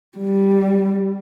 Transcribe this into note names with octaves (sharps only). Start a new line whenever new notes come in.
G3